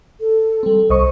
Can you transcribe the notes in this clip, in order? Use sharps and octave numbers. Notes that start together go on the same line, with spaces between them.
A4
G3 C4
C2 C5 D#5 C#6